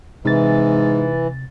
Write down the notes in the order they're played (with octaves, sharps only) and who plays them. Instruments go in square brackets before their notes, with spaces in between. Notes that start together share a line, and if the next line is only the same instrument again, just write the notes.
[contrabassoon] G#2 [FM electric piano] C3 A6 [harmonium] E3